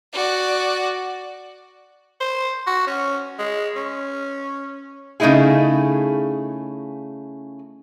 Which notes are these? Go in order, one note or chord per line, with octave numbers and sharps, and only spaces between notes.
F#4 D5
C5
F#4
C#4
G#3
C#4
C#3 A3 C4 D#4 E4 G#4